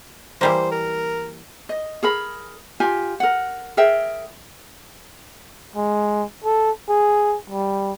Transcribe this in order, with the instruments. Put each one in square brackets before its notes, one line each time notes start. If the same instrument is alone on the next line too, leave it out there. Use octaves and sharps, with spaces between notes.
[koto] E3 G3 A#3 [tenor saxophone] C5
[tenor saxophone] A#4
[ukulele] D#5
G#4 A#4 B5
F4 G4 G#5
A#4 F#5
G#4 A#4 E5 G5
[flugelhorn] G#3
A4
G#4
G3